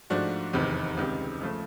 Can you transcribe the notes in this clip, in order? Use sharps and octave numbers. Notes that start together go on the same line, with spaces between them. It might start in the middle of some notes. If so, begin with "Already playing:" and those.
G#2 F3 A3 D4 F#4
F1 E2 C3 D#3
C#2 C3 D#3 G3
E1 C#3 F3 A3